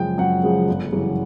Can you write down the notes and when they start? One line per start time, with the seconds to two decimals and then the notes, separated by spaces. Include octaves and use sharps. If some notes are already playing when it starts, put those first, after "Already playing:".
Already playing: F#2 C#3 F3 G#3 G5
0.18 F#2 F#5
0.43 C#3 F3 G#3
0.68 G1
0.92 F#2 C#3 E3 G3